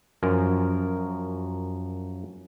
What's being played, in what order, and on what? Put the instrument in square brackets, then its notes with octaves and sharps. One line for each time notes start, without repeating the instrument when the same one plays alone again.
[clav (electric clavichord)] F#2 F3 A#4 G#5